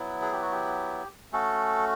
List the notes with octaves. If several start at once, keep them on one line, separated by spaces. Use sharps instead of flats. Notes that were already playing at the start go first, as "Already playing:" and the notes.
Already playing: F#3 B3 E4
G#4
G4
F#4
G4
A3 C#4 F#4 A4